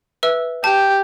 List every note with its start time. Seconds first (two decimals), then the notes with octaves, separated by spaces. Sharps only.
0.23 B4 E5 E6
0.64 G4 G5 A5